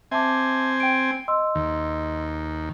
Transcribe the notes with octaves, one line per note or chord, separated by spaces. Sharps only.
C4 E5 G#5 A5 D6
G5 D7
D#5 C6 E6
D#2